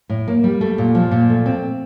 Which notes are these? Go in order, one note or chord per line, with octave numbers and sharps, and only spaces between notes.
A2
A#3
G3
A3
A#2
F3
A#2
A3
C4